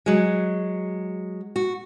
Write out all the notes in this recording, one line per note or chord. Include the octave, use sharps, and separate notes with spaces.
F#3 G#3
F#4